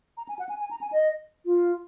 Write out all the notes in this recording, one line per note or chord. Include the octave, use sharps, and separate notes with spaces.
A#5
G#5
F#5
G#5
G#5
A#5
G#5
D#5
F4